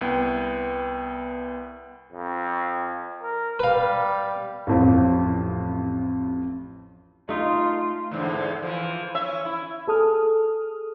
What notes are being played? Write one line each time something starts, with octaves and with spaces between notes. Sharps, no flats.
C2 B3 G5
F2
A#4
G3 B4 F5
A1 F2 F3
A3 D#4 F4
E2 G#2 D3
E3 F3
C#4 E5
E4
G#4 A4 D#6 F6